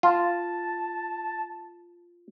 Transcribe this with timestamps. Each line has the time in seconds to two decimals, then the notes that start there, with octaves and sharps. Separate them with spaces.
0.03 F4 A5